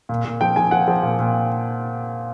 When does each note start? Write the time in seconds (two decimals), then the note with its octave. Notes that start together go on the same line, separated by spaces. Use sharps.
0.09 A#2
0.25 A#2
0.41 F3 G5
0.56 F3 G#5
0.71 F3 F#5
0.88 F3
1.03 A#2
1.19 A#2